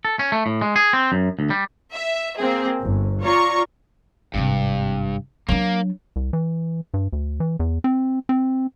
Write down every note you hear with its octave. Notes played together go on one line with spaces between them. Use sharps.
A4
C#4
A3
A2
G#3
G#4
C4
F#2
D2
G3
E5
A#3 C4 G#4
G1
F4 C#5 D5 A#5 C#6
G#1 G2 C3
F#3 A#3 D4
C2
E3
G2
D2
E3
E2
C4
C4